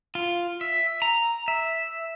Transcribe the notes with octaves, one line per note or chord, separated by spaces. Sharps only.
F4
E5
A#5
E5